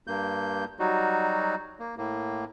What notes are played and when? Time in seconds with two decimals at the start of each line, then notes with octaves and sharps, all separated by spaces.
0.07 G2 A#3 G6
0.79 F#3 G3 D#4 F#4
1.79 A#3
1.98 A2 A#3